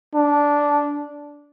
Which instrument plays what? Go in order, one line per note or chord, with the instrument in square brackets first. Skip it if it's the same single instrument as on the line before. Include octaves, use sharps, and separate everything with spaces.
[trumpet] D4